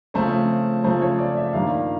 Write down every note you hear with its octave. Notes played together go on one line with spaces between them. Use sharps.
C#3 F3 A3 C4 C5
C#3 F3 A3 C4 C5
C#5
D5
E5
G2 D#3 G3 A#3 D4 F5